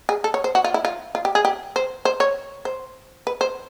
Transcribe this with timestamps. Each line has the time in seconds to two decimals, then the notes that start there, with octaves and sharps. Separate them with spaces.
0.09 G#4
0.24 A4
0.34 C#5
0.44 C5
0.55 F#4
0.64 F4
0.74 E4
0.85 F4
1.15 F4
1.25 G4
1.35 G#4
1.45 G4
1.76 C5
2.05 C5
2.20 C#5
2.65 C5
3.27 B4
3.41 C5